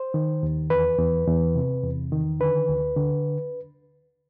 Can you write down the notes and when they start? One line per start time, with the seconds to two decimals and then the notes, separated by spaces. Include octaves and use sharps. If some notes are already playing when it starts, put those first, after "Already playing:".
Already playing: C5
0.14 D#3
0.43 D#2
0.70 E2 B4
0.98 E2
1.27 E2
1.55 C3
1.83 E2
2.12 D#3
2.40 D3 B4
2.69 D2
2.97 D3